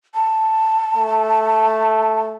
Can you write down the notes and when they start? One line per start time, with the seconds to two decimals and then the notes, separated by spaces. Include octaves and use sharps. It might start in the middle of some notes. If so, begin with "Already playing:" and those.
0.15 A5
0.96 A3